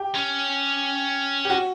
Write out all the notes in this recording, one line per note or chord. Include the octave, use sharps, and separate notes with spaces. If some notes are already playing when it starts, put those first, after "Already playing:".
Already playing: G4
C#4
G4
F#4